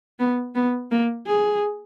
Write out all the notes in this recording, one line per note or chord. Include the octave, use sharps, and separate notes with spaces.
B3
B3
A#3
G#4